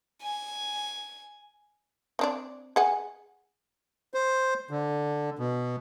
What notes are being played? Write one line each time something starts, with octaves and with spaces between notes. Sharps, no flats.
G#5
C4 D4 D5
G#4 F#5 G#5
C5
D3
B2